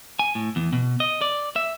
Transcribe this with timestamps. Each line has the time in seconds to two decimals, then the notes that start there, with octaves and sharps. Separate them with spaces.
0.19 G#5
0.35 A2
0.56 E2
0.73 B2
1.00 D#5
1.21 D5
1.56 E5